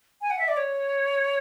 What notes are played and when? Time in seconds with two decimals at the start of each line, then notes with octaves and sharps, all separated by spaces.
0.21 G#5
0.30 F#5
0.39 E5
0.48 D5
0.57 C#5